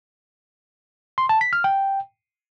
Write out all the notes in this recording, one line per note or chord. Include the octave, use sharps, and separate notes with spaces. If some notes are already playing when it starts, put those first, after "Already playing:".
C6
A5
B6
F6
G5